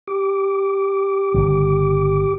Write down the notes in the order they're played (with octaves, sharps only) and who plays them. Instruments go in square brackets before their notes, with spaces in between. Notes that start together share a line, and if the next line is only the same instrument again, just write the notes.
[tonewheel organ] G4 D6
[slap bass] G1 C#3